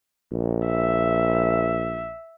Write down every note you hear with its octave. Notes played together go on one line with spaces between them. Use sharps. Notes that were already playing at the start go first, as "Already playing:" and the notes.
A#1
E5